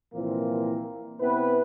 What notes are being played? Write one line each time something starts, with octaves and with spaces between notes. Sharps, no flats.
C2 A#2 E3 F3 A#3 C4
C3 B3 C4 E4 B4